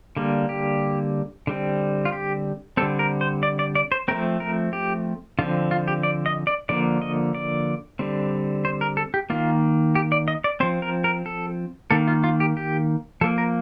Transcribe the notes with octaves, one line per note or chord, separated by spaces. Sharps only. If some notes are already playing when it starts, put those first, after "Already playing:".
D3 G3 A#3
G4
D3 G3 C4
F4
G4
D3 G3 C4 A4
A#4
C5
D5
D5
D5
C5
F3 A3 C4 A#4
A#4
G4
D3 F3 C4 F4
F4
G4
D5
D#5
D5
D3 F3 A#3 D5
D#5
D5
D3 G3 C4
C5
A#4
A4
G4
D#3 A#3 F4
G4
D5
D#5
D5
F3 C4 C5
A#4
A#4
A4
D#3 A#3 A4
F4
F4
G4
G4
F3 A#3 A4
A#4